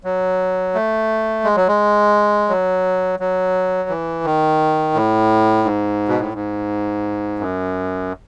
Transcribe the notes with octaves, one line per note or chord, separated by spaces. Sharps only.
F#3
A3
G#3
F#3
G#3
F#3
F#3
E3
D#3
A2
G#2
B2
A2
G#2
F#2